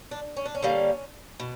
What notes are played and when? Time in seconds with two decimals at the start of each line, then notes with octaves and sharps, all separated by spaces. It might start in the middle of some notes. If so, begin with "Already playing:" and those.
0.11 D4
0.37 C#4
0.46 D4
0.55 C#4
0.62 D3 G3 A#3
1.40 B2